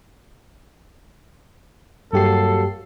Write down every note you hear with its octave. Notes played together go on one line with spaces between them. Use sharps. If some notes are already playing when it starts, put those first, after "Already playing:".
G2 F#3 A#3 G4 A4 C7